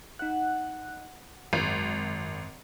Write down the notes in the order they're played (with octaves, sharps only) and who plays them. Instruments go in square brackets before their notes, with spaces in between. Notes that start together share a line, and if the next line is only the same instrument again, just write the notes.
[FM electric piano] D#4 F#6 [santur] F#5
[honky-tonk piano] G#1 [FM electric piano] F#2 G#3